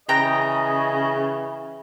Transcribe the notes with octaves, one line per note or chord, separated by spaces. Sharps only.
C#3 E3 G#4 D#5 G5 A#5